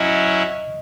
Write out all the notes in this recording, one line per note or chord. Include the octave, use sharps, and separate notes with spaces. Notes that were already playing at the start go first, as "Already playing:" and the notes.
Already playing: F#3 C#4 E4 D#5